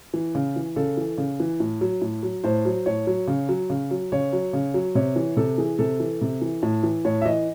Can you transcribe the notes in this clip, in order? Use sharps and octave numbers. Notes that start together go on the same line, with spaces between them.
E3
C#3
E3
C#3 A4
E3
C#3
E3
A2
F#3
A2
F#3
A2 C5
F#3
A2 C#5
F#3
C#3
F#3
C#3
F#3
C#3 C#5
F#3
C#3
F#3
C3 C#5
E3
C3 A4
E3 G#4
C3 A4
E3
C3
E3
A2
E3
A2 C#5
E5
E3 D#5